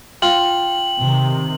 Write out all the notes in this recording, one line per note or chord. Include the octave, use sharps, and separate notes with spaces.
F4 G5 F#7
C3 D#3